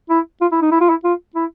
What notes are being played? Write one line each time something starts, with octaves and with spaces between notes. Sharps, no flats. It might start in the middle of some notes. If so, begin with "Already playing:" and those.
E4
F4
E4
D#4
E4
F4
E4
F4
E4